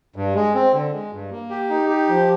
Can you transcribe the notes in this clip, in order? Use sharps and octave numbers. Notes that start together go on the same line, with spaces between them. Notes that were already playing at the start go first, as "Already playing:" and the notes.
G2
G#3
C4
D3
G#3
G2
A#3
G4
D#4
G4
F3